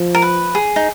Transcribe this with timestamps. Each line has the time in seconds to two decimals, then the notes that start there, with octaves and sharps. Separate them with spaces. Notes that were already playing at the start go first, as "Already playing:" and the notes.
Already playing: F3
0.14 A#4
0.22 B4
0.55 G#4
0.76 D#4